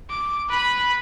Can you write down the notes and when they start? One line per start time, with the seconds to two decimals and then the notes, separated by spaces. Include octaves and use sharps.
0.10 D6
0.50 B4 B5